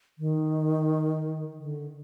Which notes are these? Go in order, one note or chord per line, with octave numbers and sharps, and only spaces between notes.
D#3
D3